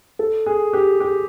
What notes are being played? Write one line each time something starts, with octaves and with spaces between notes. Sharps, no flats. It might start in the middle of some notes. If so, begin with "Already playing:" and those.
A4
G#4
G4
G4